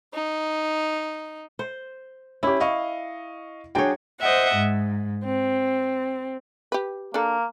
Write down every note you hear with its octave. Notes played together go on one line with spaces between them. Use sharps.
D#4
C5
C#4 E4 G4
D#5 F5 C#6
F#3 D4 G#4 C#5 G5
C5 D#5 E5 F#5
G#2
C4
G4 B4
A#3 D4 A4